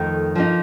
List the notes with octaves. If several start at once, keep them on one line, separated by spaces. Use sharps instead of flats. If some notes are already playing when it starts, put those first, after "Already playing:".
Already playing: F2 D#3 A3 D#4 A#4
F3 A#3 D#4